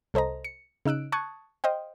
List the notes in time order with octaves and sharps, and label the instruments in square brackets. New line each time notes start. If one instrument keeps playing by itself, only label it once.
[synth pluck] C2 A4 C5 D#5 A#5
C#7
C#3 D#4 E6 F#6 D7
A5 C#6 D#6 F#6 G#6
C5 D#5 F5 G5